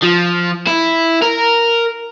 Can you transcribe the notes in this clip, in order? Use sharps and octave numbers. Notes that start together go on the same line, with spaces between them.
F3
E4
A#4